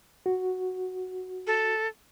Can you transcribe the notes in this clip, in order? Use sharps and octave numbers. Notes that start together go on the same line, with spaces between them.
F#4
A4